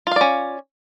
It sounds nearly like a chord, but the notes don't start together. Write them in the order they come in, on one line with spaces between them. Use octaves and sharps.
F4 F5 D5 C#4